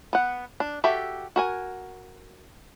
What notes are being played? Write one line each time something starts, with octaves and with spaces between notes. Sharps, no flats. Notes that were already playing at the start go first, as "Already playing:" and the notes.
B3 F#5
D4
F#4 G4 A4 E5
F#4 A#4 G#5